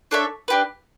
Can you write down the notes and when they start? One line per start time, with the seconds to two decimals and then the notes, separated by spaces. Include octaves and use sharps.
0.11 D4 A4 C#5 E5
0.48 D4 G4 B4